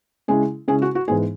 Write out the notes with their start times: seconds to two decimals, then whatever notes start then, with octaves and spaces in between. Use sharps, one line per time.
0.28 C#3 G#3 C#4 E4 G#4
0.68 C#3 G#3 C#4 E4 G#4
0.82 F#4
0.95 F#4
1.08 G#2 E3 G#3 B3 D#4 G#4